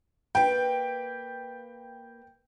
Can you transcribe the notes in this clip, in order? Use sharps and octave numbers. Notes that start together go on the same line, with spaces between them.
A#3 B4 G5